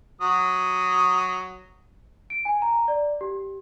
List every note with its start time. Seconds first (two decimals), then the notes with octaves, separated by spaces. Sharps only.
0.21 F#3 D#6
2.30 D7
2.45 G#5
2.62 A#5
2.88 D5
3.21 G4